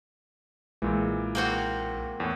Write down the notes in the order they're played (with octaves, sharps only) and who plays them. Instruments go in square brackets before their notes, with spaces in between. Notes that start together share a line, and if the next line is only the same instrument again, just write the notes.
[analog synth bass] B1 [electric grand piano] A#2 E3 [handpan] G#3
[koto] A#3 C4 F#4
[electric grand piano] E2 A2